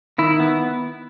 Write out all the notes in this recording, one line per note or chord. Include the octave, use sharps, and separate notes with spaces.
D#3 E4
B3